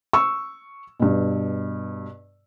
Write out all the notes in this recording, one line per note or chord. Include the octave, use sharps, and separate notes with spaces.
C#6 E6
G2 B2